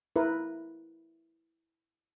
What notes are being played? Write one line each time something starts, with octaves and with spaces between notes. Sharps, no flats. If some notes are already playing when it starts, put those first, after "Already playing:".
E4 A#4 B4